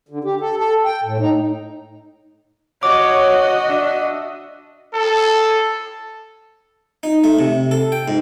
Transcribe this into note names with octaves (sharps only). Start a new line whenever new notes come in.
D3
G4
A4
A4
G5
A2
D#4
F#4 C#5 D#5 D6
D4 E5
A4
D#4
A3
C3
A4
G5
G#2